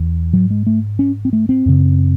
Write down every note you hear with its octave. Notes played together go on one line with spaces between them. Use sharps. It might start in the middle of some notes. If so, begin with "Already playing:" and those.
Already playing: E2
G#2 F#3
G#3
A3
C#4
C4
A3
C4
F#2 C#3